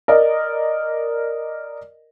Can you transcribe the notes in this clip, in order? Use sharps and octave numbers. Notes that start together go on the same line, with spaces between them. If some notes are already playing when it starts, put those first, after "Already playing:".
A#4 D5 D#5